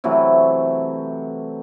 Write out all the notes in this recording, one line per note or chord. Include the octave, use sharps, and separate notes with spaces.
C3 E3 F#3 A3